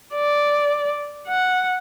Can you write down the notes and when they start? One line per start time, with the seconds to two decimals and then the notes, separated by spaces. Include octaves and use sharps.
0.15 D5
1.28 F#5